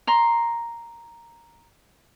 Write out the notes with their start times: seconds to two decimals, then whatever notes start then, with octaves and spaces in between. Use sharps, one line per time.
0.07 A#5 C6